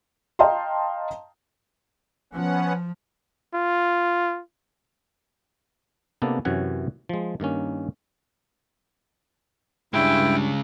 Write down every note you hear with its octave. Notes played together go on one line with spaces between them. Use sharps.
D#5 F5 G5 A5 A#5 C6
F3 B3 C#4 F#5
F4
C3 A#3 B3 D4 A4
F#2 C3 E3 C#4 F#5 G#5
F3 G#3
G2 D#3 A#3 C#4
G2 C#3 G#3 D4 E4 G5